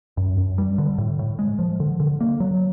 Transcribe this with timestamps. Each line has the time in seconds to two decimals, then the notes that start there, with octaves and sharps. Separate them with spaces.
0.17 F#2
0.37 F#2
0.58 G3
0.78 D3
0.98 A2
1.19 A2
1.39 G#3
1.59 F3
1.80 D3
2.00 D3
2.21 A#3
2.40 F#3